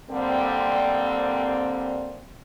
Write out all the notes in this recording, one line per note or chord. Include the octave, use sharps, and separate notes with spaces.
D3 G3 A#3 C4